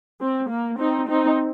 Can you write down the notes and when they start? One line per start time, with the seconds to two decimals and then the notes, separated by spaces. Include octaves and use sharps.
0.21 C4
0.50 A#3
0.79 C4 D#4
1.08 C4 D#4